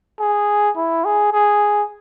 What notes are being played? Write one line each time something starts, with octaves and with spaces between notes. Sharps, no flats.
G#4
E4
G#4
G#4